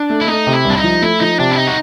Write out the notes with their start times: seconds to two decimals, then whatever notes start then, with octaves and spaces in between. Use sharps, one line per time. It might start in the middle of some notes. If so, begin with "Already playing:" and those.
Already playing: D4
0.10 A3
0.21 E4
0.27 A3 D#4
0.47 C3
0.53 E4
0.65 C2 D4
0.77 D#4
0.84 F3
1.02 A3 E4
1.20 F3 D#4
1.39 C3 D4
1.51 E4
1.58 D#4
1.67 F#4